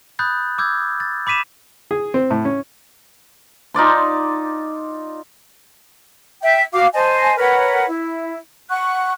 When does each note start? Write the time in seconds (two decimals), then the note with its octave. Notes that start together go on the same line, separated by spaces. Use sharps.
0.19 B5 D#6 F#6 G6 A6
0.58 D6 E6 G6 G#6
1.00 A6
1.27 B5 D6 B6 D#7 E7
1.91 G#4
2.14 C4
2.31 A2
2.45 C#4
3.74 D#4 F4 D5 C6
6.42 E5 G5
6.73 F#4 F5 D6
6.93 C5 D#5 G#5 A5
7.37 A#4 B4 C#5 F#5
7.88 E4
8.70 F#5 C#6 F#6